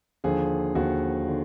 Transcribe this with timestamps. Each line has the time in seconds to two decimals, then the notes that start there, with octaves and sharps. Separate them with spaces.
0.24 D#2 D3 F3 G#4
0.75 D#2 D3 F3 F#4
1.28 D3